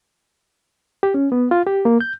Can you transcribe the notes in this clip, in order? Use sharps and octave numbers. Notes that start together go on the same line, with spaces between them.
G4
C#4
B3
F4
G4
A#3
G6